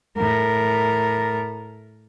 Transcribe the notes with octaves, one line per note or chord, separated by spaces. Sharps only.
A2 A#4